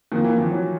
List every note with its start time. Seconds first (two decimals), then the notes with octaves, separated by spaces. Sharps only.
0.12 D#3 F3 A#3
0.24 E3
0.37 D#3 F3
0.51 E3 F#3